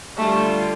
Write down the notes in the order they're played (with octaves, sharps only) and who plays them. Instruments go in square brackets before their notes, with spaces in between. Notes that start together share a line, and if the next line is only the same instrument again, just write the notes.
[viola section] D3 G3 F4 [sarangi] A3